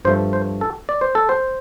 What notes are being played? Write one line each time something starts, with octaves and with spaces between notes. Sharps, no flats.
G2 F3 A3 C5
C5
A4
D5
C5
A4
C5